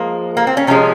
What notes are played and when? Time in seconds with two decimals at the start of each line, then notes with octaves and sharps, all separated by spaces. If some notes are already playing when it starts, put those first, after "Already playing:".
Already playing: F3 G#3 A#3
0.37 A#3
0.47 C4
0.57 C#4
0.67 C3 F3 G#3 C#4